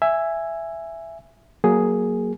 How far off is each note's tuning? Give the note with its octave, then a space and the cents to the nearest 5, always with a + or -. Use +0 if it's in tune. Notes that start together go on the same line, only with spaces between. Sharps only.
E5 +10 G#5 -5
F#3 +0 A#3 +0 G#4 +5